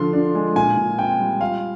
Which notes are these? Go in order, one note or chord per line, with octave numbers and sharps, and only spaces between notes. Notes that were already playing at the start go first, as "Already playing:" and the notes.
Already playing: D3 F3 F4 C6
D4
G#3
A#2 G#5
A#2
C4 G5
G3
F4 F5